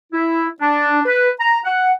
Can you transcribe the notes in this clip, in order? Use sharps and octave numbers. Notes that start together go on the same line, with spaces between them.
E4
D4
B4
A#5
F#5